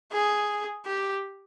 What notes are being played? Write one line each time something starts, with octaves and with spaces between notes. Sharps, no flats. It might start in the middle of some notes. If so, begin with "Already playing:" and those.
G#4
G4